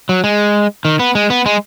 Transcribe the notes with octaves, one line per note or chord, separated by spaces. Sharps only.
F#3
G#3
D#3
B3
G#3
B3
G#3